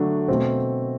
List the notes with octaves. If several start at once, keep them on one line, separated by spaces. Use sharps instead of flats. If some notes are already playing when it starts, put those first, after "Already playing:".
Already playing: D3 F#3 A3 D4
B2 A3 C4